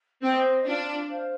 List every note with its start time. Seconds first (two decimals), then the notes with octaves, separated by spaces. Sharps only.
0.22 C4 C5 D#5
0.66 D4 F4
1.10 C5 F5